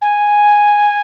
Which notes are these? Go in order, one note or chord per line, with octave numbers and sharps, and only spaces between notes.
G#5